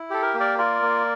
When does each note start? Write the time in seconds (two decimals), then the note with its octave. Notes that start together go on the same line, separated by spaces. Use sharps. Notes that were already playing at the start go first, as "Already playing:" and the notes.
Already playing: E4
0.10 G4 A4
0.22 A#4
0.34 A#3
0.40 A#4 D5
0.58 F4 A#4 D5
0.82 A#3